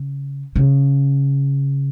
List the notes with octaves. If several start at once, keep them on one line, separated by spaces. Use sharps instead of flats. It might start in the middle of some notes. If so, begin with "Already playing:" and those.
Already playing: C#3
C#3